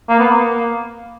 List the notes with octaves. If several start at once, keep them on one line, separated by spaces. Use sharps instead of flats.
A#3
B3
A#3